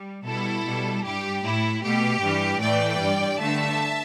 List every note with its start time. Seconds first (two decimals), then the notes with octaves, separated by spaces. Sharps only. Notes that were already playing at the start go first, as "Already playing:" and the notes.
Already playing: G3
0.26 B2 G3 E4 A4
0.65 B2 G3
1.04 G2 G3 G4
1.44 A2 A3 E4
1.82 B2 A3 G4
2.22 G2 E3 G3
2.61 A2 E3 A3 D5 G5
3.00 G2 G3
3.39 G2 D3 A3 E5 A5